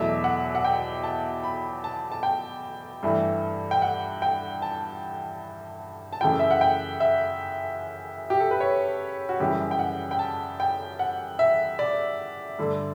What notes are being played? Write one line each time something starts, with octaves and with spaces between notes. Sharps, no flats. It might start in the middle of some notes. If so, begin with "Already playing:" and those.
Already playing: E2 B2 F#3 A3 E5
F#5
F#5
G5
A5
B5
A5
A5
G5
G2 E3 A3
G5
F#5
G5
A5
A5
F#2 C#3 E3 A3 G5
E5
F#5
G5
E5
G4
A4
B4
C#5
F#4
F#2 C#3 E3 G3 G4
G5
F#5
G5
A5
G5
F#5
E5
D5
G2 D3 A3